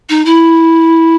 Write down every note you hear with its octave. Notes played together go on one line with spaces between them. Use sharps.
D#4
E4